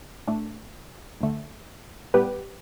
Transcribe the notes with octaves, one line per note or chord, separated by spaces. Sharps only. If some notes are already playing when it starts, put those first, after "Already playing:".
A2 A3 D4
D2 D3 A3
A2 G3 B3 G4 B4